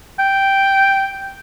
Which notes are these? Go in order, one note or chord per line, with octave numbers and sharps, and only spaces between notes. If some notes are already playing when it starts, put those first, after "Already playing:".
G5